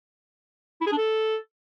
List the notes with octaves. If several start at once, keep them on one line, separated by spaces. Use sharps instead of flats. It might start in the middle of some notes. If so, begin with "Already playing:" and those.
E4
G#4
D4
A4